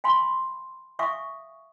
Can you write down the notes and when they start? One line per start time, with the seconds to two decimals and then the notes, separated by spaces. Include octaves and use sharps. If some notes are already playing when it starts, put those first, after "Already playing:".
0.04 F5 G#5 B5 C6
0.99 E5 F5 G#5 C#6 D#6